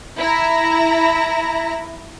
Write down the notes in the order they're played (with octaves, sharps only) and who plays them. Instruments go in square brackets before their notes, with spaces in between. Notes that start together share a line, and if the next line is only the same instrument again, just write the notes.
[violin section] E4 A#5